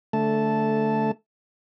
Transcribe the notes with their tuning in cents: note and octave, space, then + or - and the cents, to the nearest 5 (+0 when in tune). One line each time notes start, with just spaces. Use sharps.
D3 -10 A3 +0 A5 -5